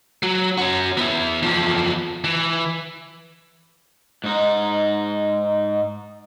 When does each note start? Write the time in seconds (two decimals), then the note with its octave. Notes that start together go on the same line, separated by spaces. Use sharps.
0.23 F#3
0.58 C#4 F#4
0.98 B3 E4
1.43 E2 F3
2.24 E3
4.24 G#2 D#4